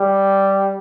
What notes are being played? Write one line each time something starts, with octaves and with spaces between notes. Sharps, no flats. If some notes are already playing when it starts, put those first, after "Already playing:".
Already playing: G3